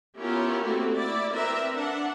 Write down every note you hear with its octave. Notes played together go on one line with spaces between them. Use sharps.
B3 C#4 E4 F4 G4 A#4
A3 A#3 C4 E4 F#4 G4
E4 D5
C4 A#4 B4 E5
D4 F#5